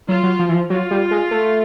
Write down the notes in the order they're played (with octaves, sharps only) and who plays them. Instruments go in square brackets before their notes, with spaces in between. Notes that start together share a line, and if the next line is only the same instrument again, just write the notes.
[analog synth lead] F#3 [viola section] F4
[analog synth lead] F#3
F3
E3
F3
[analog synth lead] F#3 [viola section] F4
[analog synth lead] G3
G#3
A3